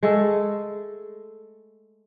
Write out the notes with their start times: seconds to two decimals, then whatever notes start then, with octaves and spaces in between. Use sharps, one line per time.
0.03 G#3 A3 A4